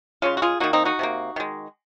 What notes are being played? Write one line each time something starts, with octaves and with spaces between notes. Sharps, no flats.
C#3 G#3 C#4 F4
F#4
F4 G#4
D#3 A#3 D#4 F#4
C4 D#4
D#4 F#4
C3 F3 A#3
D#3 G#3